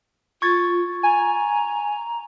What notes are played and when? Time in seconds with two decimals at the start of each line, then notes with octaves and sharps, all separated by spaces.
0.42 F4 C#6 G#6 A6
1.03 G#5 A#5